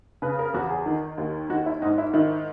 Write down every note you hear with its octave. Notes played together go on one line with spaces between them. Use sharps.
C#3 B4
A#4
E2 F#4
G#4
D#3
D#2
D#3 F#4
E4
G#2 D#4
E4
D#3 E4